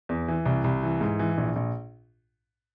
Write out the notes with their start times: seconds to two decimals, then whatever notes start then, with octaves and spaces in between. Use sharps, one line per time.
0.09 E2
0.28 E3
0.45 C2
0.64 C2
0.83 E3
1.01 G#2
1.19 E3
1.38 A#1
1.56 A#1